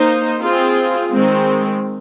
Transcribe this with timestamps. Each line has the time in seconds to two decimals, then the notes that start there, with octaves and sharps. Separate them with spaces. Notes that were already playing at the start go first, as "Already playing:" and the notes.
Already playing: A#3 D#4 C5
0.42 C4 F4 G#4
1.12 D#3 G#3 C4